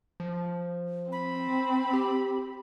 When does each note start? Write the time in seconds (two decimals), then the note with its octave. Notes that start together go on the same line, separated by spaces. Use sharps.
0.20 F3
1.12 C4 B5
1.93 G4